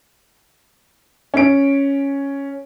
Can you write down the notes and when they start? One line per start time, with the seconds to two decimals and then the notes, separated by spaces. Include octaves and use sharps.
1.34 C#4 D7